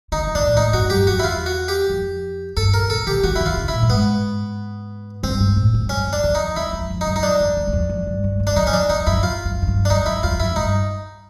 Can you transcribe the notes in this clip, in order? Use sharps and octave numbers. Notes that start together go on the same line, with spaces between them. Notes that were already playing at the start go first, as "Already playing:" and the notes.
D3 D#4
E3
D#3 D4
A#2
A2 D#4
G2 F#4
F#2 G4
F2 F#4
E4
E2 F4
F#4
G4
F2
G2 A4
B2 A#4
B2 A4
D#3 G4
E3 F#4
D#3 E4
F4
C#3
E4
A#2
G2
G#2 B3
G2 C4
G#2
A2
G2
F#2 C#4
F#2
D4
E2
D#4
F2
E2 E4
F2
F2
D#4
F#2
D#4
G2 D4
F2
E2
F#2
F2
F#2
G2
G2
G2
D4
F#2 D#4
C#4
E2 D4
F2 D#4
F#2 E4
F2 F4
F#2
F#2
G2
D4
F#2 D#4
G2 E4
F2 F4
F#2 E4
G#2
G2 D#4